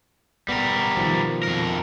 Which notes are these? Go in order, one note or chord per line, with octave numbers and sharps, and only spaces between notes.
G3 B3 A#4
B2 D#3 F3
F2 A#4